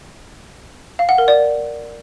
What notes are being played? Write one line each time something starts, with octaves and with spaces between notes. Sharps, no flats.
F5
F#5
A#4
D5